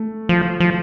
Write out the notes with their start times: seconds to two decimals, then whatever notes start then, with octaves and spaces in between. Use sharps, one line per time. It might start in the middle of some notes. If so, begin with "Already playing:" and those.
Already playing: A3
0.29 F3
0.60 F3